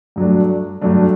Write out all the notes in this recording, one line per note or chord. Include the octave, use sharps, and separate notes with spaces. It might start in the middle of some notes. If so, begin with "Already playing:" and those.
G2 F#3 A3 D4
G2 F#3 A3 D4